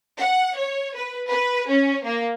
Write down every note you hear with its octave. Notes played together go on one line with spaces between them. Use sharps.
F#5
C#5
B4
B4
C#4
A#3